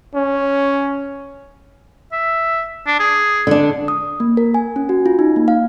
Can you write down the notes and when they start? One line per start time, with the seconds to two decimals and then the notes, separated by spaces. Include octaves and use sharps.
0.15 C#4
2.12 E5
2.87 D4
3.00 G#4
3.47 D3 D4
3.88 D#6
4.20 A#3
4.37 A#4
4.54 G#5
4.76 C#4
4.89 F#4
5.06 F4
5.19 D#4
5.36 A#3
5.48 F5